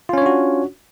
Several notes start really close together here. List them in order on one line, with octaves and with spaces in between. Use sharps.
F4 C#4 C#5 D4 F#4